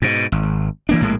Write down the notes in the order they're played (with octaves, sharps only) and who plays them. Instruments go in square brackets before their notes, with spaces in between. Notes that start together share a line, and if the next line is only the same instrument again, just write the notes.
[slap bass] G#2 B2
G#1
E3 A#3 D4
A#1 A2 G#3 A#3